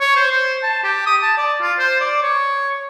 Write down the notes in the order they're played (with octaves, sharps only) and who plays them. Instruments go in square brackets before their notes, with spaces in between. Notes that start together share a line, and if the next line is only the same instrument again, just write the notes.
[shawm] C#5
C5
C5
A5
G4
D#6
A5
D5
F4
C5
D5
C#5